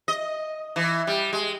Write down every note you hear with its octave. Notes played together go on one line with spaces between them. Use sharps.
D#5
E3
G3
G#3